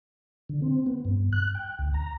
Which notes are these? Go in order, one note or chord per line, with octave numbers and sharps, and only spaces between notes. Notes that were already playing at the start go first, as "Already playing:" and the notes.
D3
C4
B3
G2
F#6
G5
D2
A#5